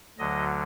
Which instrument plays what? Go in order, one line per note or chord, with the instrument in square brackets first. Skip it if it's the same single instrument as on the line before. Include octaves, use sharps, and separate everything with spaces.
[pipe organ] D2 D3 F#3 D#5